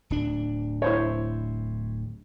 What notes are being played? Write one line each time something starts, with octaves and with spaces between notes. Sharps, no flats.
D1 D4
E4 C5 C#5